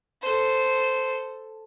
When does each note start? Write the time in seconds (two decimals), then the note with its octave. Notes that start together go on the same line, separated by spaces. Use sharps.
0.22 A4 C5